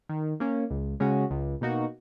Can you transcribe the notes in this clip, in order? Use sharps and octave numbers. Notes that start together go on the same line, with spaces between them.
D#3
A#3 C#4
C#2
C#3 G#3 C#4 F#4
C#2
B2 A#3 D#4 F#4